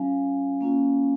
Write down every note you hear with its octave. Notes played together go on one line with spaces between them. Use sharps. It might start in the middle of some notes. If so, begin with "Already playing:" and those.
Already playing: F#3 C#4 F4 F5 G#5
A#3 C#4 F4